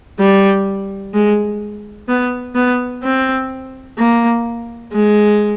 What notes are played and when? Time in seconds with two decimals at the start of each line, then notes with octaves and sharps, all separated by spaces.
0.19 G3
1.14 G#3
2.08 B3
2.55 B3
3.03 C4
3.98 A#3
4.92 G#3